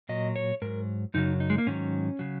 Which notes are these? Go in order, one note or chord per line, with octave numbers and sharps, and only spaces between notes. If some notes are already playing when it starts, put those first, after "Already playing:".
A#2 F#3 D#5
C#5
G#2 F#3 A#4
F#2 C#3 F#3 D#4
D#4
G#3
A#3
G#2 D#3 F#3 C#4
C#3 F#3